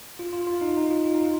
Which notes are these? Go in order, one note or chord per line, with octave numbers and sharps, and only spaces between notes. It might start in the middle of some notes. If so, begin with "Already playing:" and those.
F4
F4
F4
D#4
D#4
F4
F4
D#4
F4